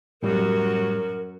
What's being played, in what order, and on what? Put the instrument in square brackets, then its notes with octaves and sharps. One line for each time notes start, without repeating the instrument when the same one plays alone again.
[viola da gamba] F#2 F#3 F#4 [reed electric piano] A2 G3 [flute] A#4